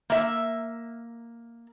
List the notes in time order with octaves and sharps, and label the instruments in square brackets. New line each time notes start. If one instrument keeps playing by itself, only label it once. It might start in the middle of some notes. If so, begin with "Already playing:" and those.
[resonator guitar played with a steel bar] A#3 E5